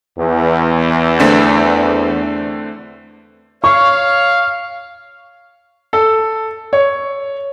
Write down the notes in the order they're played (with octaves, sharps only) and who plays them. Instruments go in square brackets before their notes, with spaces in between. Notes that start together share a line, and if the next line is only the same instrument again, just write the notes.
[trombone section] E2
[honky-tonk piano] D3 A3 C4
[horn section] C#5 F5 [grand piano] C#6
[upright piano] A4
C#5